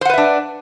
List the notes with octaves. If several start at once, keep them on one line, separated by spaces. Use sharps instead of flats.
D4 B4 C5 E5 F#5